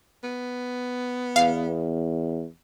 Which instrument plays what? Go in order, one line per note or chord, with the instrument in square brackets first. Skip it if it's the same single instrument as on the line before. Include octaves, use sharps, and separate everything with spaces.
[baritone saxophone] B3
[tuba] E2 [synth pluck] F5